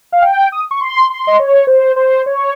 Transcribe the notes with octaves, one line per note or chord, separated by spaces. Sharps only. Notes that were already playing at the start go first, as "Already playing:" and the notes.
F5
G5
D#6
C#6
C6
C6
D#5
C#5
C5
C5
C#5